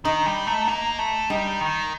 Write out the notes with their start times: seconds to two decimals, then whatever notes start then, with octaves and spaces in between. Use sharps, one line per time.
0.05 D#3 D#4
0.26 G3
0.47 A3
0.67 A#3
0.99 A3
1.30 G3 D#4
1.61 D#3